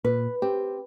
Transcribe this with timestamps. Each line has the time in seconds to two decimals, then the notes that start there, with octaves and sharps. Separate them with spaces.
0.05 A#2 B4
0.42 C4 G4